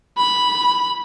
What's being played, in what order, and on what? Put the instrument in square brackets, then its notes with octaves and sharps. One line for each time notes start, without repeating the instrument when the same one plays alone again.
[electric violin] B5